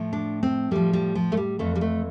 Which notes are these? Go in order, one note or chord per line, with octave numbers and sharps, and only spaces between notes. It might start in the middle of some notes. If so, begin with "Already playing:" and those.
Already playing: A2 F3
D4
C4
A2 F3 G3
G3
F3
A3
G3
F2 E3 A3
G3
A3